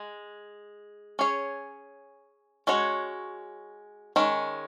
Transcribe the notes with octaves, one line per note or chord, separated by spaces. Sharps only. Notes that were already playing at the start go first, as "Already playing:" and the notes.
Already playing: G#3
C#4 G#4 C#5
G#3 C#4 F#4 C#5
D#3 G#3 C#4